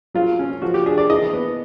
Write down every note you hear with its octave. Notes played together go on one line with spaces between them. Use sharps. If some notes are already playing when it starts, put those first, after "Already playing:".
F#3 F4
C#4
F3 F#4
G4
D4 G#4
D5
E3 D#5
B3